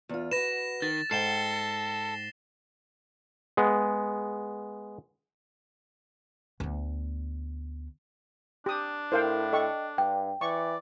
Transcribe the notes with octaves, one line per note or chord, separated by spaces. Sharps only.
E2 F4
F#4 B4 A#6 E7
D#3 A6
G#2 A4 G5 C7 E7 G7
G#3 B3
D2 B3
D4 G4 D#6
A2 E4 A#4 C5 F5 G5
A4 D#5 G5 C#6
G2 G5
E3 D5 C#6